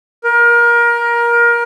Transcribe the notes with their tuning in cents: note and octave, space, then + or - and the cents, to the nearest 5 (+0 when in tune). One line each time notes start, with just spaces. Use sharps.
A#4 +25